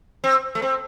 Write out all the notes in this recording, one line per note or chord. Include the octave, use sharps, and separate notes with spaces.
C4
A3
C4